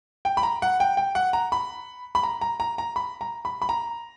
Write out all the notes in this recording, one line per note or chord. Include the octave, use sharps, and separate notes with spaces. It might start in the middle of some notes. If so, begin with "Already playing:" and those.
G5
B5
A#5
F#5
G5
G5
F#5
A#5
B5
B5
A#5
A#5
A#5
A#5
B5
A#5
B5
B5
A#5